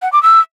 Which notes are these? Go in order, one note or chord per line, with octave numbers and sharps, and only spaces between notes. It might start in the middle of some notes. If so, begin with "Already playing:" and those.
F#5
D6
E6